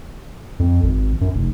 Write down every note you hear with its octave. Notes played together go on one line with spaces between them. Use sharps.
F2
G#1
F#2
F1